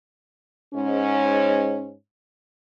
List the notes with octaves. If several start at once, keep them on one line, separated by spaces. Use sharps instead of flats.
G#2 C#4